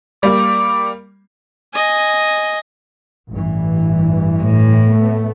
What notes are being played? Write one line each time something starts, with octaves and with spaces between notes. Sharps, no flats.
G3 A#3 D6
D#5 G#5
A1 G2 E3
A2
A3 B3